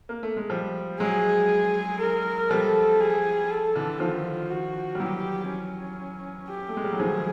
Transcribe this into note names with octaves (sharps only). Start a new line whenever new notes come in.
A#3
A3
G#3
F3 G3
F#3 G#3 G#4
A#4
F3 G3 A4
G#4
A4
D3 E3
D#3 F3 F4
F#4
G3
E3 F#3 G4
C#4
G4
A3
G#3
G3
F#3
D#3 F3 G#4